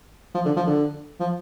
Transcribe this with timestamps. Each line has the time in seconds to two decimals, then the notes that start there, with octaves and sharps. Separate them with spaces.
0.35 F3
0.45 D3
0.56 F3
0.67 D3
1.20 F3